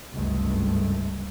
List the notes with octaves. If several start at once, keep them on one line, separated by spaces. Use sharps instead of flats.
F#1 C#2 G2 C3 G#3 A3